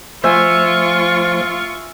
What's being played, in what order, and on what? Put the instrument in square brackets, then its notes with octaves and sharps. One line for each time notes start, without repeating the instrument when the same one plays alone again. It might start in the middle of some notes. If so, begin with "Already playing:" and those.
[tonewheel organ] F3 A3 C5 [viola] F4 C#6 [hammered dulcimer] E5 G#5